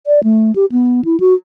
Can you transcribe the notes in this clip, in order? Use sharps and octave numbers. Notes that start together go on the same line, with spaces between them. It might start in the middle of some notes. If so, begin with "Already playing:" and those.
D5
A3
G4
B3
E4
F#4